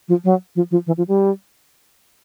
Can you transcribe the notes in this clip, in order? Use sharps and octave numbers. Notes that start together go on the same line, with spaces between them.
F3
F#3
F3
F3
E3
F3
G3